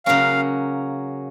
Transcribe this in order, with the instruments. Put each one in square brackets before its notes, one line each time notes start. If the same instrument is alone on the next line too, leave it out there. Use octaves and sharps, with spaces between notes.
[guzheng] C#3 F#3 A#3 C#4 [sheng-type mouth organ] F5